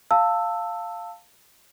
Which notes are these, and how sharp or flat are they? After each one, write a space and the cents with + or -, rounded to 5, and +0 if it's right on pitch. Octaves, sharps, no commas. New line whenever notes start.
F5 +0 A5 +20 E6 +0